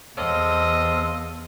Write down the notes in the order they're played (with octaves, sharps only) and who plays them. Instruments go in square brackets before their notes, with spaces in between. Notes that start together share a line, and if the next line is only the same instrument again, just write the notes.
[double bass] E2 [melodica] C4 A4 F5 [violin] D#5